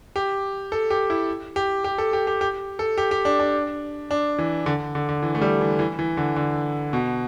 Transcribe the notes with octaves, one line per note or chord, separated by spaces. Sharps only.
G4
A4
G4
E4
G4
G4
A4
G4
G4
G4
A4
G4
G4
D4
D4
D4
E3
D3
D3
D3
E3
A3
G3
E3
E3
E3
D3
D3
B2